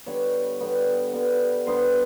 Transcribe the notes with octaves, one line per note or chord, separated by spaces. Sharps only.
D3 G3 B3 C#5
D3 G3 B3
D3 G3 B3
D3 G3 B3 C5